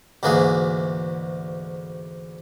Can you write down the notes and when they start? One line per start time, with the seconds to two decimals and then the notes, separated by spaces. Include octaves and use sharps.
0.23 D2 G#2 E3 A#3 F#4 G#4